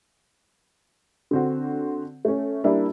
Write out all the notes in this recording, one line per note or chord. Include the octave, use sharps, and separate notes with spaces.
D3 C4 F#4
A3 C#4
G3 A#3 D4 E4 G4